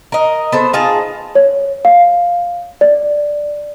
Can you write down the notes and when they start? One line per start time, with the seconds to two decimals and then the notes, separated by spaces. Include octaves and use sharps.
0.12 A#4 D#5
0.52 B3 A4 C5
0.73 D#4 F4 G#4 A5
1.35 C#5
1.85 F5
2.81 D5